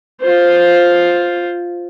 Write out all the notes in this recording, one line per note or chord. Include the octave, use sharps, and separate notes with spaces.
F4 C5